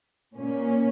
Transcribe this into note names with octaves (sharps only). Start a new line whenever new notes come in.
A#2 A#3 C#4